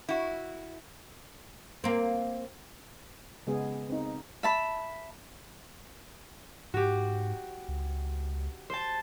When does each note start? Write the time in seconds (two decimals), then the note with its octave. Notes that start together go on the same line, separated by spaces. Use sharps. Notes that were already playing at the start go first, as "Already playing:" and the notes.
0.09 E4 F#4
1.84 A#3 C4
3.47 C#3 G#3 B3 G#4
3.89 C4 D#4
4.43 E5 A5 B5
6.74 G#2 F#4 G4
7.68 C#2
8.70 C5 A5